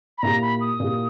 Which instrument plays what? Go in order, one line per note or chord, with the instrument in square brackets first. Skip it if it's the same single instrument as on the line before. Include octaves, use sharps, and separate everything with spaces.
[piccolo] B5
[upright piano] A#2 A#3 E4 G4 [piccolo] A#5
[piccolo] B5
D#6
[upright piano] A#2 A#3 E4 G4